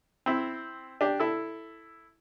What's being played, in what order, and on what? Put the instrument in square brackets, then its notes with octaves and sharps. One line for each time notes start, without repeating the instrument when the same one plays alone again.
[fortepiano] C4 E4
D4 G4
E4 A4